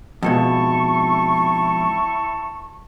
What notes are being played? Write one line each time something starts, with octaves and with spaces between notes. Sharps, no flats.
F2 G#2 B2 E4 A5 C#6